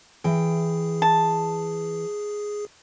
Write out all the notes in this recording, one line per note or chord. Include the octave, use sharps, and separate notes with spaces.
E3 G#4 G5
A5